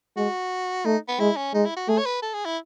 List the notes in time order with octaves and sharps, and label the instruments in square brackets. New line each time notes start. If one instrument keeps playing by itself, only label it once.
[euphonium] G#3 [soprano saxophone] F#4
[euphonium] A3 [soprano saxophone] D#4
[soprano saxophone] B3
[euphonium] G#3 [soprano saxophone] E4
[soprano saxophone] C#4
[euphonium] G#3 [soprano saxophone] D#4
[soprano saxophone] E4
F#4
[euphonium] A3 [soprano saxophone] G#4
[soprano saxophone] C#5
B4
A4
G#4
E4